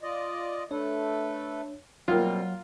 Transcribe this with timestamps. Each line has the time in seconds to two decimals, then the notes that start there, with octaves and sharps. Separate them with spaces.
0.02 F4 D5 D#5
0.71 A3 D4 A4 B4 C#5
2.08 B2 F#3 G3 A#3 C4 F4 F#5